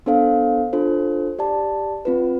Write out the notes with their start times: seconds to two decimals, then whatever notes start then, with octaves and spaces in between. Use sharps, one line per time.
0.06 B3 D4 A4 C5 F5
0.73 D4 F4 A4 C5
1.39 G4 D5 A5
2.05 C4 F4 B4